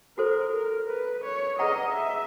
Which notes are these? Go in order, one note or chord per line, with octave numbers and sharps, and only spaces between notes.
F#4 A4 A#4 C5
A#4
B4
C#5
G#4 B4 D5 D#5 F#5 A#5
E5